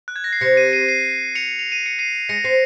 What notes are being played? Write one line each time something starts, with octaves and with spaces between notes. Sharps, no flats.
F#6
G#6
A#6
C7
C3 A#6 C#7
C7 D#7
C7 D#7
C7 D#7
C#7 F7
F7
D#7
C#7
C7 D#7
G#3 A#6 C#7
C4 C7